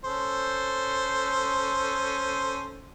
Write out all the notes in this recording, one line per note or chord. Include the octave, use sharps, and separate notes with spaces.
C#4 A4 C5